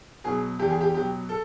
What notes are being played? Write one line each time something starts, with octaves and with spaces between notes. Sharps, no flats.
B2 F#3 G#4
E2 G4
G#4
G4
B2 F#3 G4
A4